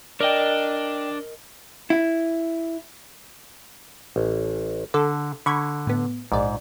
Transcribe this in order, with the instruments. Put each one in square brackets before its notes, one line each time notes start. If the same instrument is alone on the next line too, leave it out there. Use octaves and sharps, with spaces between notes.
[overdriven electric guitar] D4 [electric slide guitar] A#4 D#5 [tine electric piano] D5 G5
[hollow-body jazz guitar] E4
[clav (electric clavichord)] A1
[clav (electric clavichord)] D3 [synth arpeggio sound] A4
[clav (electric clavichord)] D3 [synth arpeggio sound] B5 C#6 G#6
[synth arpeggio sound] A2 B3
[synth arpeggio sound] A#1 D5 [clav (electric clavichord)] G#2